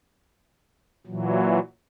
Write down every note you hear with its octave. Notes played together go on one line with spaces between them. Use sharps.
A#2 E3 F#3